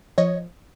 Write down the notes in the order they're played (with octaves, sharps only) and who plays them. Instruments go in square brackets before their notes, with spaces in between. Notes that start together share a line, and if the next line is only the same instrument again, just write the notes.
[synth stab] F3 C#5 D#5